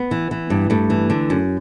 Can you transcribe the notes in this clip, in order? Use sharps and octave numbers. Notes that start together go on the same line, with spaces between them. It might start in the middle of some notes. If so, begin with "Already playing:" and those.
Already playing: B3
E3
E3
G2
G2 A3
E3
D3
F#2